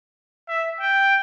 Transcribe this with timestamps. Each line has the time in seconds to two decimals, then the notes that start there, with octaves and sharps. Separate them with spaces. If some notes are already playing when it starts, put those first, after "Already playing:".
0.49 E5
0.81 G5